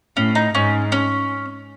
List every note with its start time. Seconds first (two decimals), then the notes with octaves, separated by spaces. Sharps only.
0.17 A2 C#4
0.35 D#4
0.55 G#2 C#4
0.92 C#4